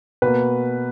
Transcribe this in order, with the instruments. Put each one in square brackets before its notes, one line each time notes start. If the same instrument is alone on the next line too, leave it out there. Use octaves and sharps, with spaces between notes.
[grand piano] B2 A#3 B4